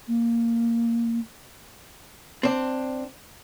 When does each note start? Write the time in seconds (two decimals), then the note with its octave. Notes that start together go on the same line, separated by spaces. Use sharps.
0.08 A#3
2.43 C4 D4